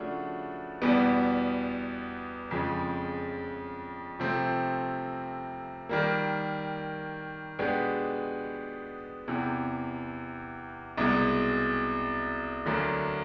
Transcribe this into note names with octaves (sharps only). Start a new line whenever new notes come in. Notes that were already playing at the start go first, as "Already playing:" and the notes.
Already playing: C#3 F3 A3 D4 F#4
E2 B2 G3 B3
F2 C#3 F3 G#3
C3 F3 A3 C4
D#3 G3 A#3
B2 G#3 B3 D4 G4
E2 C3 E3
C2 B2 G#3
D2 D3 F#3 A#3